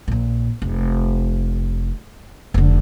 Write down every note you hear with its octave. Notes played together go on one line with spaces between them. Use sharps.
A#1 A#2
F1
F1 D3